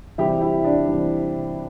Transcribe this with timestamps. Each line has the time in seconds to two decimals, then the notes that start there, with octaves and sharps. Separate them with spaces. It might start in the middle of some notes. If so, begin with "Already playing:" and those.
0.18 C3 E3 G3 E4 G4
0.42 E4
0.64 D4
0.87 C3 E3 G3